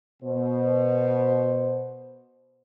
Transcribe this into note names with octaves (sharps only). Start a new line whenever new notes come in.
B2 C5